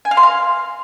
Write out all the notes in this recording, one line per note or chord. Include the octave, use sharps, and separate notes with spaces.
G#5
F5
C6
F5